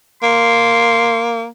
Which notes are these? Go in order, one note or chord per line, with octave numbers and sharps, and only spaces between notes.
A#3 C6